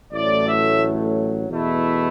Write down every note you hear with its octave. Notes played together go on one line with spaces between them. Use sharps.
A1 A2 F#3 A3 D5
E5
E2 B2 A3 E4